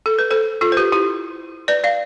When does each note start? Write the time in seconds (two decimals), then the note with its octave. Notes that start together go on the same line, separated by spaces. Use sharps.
0.06 A4
0.19 B4
0.31 A4 C5
0.61 F4 A4
0.72 C5
0.77 G4 B4
0.92 E4 G4
1.68 B4 D5
1.84 D5 F5